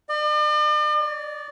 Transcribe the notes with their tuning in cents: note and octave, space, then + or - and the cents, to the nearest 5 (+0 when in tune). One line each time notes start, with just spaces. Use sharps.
D5 +45
D5 -25